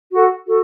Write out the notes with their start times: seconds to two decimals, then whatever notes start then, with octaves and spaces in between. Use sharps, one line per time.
0.11 F#4 A4 F#5
0.46 F#4 A4